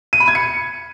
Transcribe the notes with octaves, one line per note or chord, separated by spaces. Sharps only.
D#7
B5
G#6
C#7